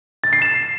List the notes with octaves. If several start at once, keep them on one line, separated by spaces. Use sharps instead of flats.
A6
C7
E7